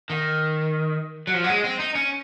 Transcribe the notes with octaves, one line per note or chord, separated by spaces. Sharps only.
D#3
F#3
F3
F#3
G#3
C4
D#4
C#4